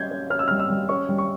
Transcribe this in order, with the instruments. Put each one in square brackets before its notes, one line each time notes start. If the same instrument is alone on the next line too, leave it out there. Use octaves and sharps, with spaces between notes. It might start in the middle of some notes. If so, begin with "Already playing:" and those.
Already playing: [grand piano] G3 C#4 G6 G#6
C#4
C#4 F6
E6
G3 F6
E6
G3
C#4 C#6
G3
C#6